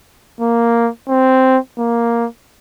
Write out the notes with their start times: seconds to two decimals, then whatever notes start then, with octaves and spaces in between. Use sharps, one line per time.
0.41 A#3
1.09 C4
1.78 A#3